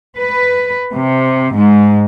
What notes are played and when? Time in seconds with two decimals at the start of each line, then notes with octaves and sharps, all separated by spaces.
0.19 B4
0.93 C3
1.55 G#2